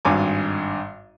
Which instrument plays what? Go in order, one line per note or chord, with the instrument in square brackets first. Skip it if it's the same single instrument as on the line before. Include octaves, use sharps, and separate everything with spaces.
[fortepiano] G#1 G2 G#5 D6